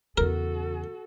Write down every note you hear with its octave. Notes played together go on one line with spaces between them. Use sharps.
E2 C#3 F#4 A4 A#4